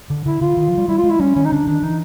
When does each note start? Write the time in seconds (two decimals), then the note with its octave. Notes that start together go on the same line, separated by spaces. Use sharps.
0.10 D3
0.25 D3 E4
0.41 D3 F4
0.57 D#3
0.68 F3
0.78 G3
0.88 G3 E4
0.98 F4
1.03 G#3
1.10 E4
1.20 G3 C#4
1.35 D#3 C#4
1.45 D#4
1.52 D3 D4
1.67 D#3 D4
1.82 E3 D#4